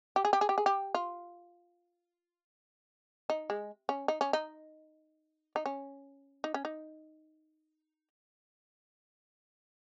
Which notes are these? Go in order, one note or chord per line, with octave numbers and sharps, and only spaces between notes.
G4
G#4
G4
G#4
G4
G#4
G4
F4
D#4
G#3
C#4
D#4
C#4
D#4
D#4
C#4
D#4
C#4
D#4